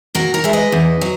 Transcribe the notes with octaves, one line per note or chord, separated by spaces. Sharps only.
A#2 F#4 A#4
A#4 C#5
G#3 E5
B4 D#5
E2
F#3